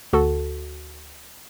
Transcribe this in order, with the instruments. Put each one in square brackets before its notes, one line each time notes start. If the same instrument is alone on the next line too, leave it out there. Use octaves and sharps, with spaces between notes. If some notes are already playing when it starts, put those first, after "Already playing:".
[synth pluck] D2 F#4 A4